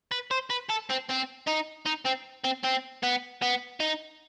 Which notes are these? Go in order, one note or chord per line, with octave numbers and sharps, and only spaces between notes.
B4
C5
B4
A4
C4
C4
D#4
D#4
C4
C4
C4
B3
B3
D#4